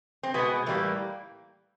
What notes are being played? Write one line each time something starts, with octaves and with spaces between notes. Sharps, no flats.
C4
B2 G#3 B3
A2 E3 G3 A#3